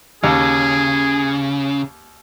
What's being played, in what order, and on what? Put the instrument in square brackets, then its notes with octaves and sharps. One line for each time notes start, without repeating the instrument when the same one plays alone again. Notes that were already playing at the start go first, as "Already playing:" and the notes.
[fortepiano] D#2 [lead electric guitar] C#3 [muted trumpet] G#4